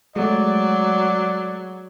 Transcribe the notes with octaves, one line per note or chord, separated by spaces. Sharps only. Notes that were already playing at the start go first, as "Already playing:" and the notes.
F#3 G#3 A3 D5